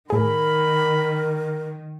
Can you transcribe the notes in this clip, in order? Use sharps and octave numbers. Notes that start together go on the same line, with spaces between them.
A2 D#3 G#4 A#4 B5